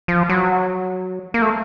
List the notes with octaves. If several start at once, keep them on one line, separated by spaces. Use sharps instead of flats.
F3
F#3
A#3
A3